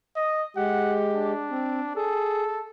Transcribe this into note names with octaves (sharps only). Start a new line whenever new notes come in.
D#5
G#3 G4 F#5
D4
C4
G#4 A4